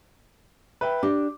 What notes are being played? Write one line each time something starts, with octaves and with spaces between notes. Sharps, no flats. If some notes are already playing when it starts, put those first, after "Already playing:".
B4 E5 G5
D4 G4 D6